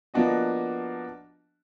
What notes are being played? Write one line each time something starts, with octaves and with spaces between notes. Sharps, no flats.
F3 A#3 B3 D4 F#4 D#5